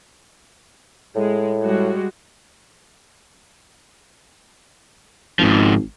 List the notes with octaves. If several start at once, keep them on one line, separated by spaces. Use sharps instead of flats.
A2 G#3
G3 G#3 F#4
G#1 G#2 F3